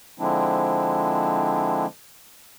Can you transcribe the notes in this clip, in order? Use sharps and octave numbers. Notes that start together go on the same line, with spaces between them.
D3 F3 G#3 C4 D4 E4